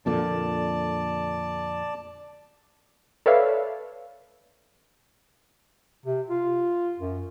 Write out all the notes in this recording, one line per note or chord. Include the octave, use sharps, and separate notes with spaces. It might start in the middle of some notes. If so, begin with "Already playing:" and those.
F2 A#2 D3 D5 A5
A4 B4 C#5 D5 E5 F5
C3
F4
F#2